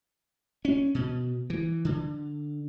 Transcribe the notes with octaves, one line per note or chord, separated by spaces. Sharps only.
C#4
B2
E3
D3